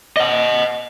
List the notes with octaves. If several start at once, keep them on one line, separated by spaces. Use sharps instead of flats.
D#5 F#5